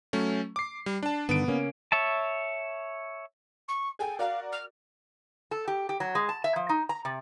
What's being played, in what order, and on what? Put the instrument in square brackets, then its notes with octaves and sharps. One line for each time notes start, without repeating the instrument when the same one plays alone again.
[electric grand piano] F#3 A3 C#4
D6 C7
G3
D4 A5
[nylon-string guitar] G2 D3 D#3 [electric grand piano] B3 D7
[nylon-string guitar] C#3 A#3 C#4
[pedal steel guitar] C#5 E5 A5
[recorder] C#6
[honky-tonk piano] G#4 A4 G5 [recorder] G#5
[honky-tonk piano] F#4 A#4 D5 [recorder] F5
[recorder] F6
[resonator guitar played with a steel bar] A4
G4
G4
F#3
G#3
A5
E5
F3
D#4
A#5
C3